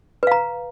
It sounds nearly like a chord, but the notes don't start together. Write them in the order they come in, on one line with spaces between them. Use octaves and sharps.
B4 F5 A#5